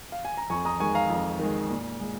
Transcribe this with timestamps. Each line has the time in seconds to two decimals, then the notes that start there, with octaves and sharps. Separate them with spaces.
0.12 F5
0.25 G#5
0.37 A#5
0.50 F2 G#5 C#6
0.65 A#5 D#6
0.80 D#3 G#3 G#5 C#6
0.95 F5 A#5
1.10 F2
1.39 D#3 G#3
1.69 A#2
2.00 G#3